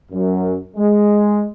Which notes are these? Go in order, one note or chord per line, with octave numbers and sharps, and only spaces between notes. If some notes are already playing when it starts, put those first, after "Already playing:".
F#2
G#3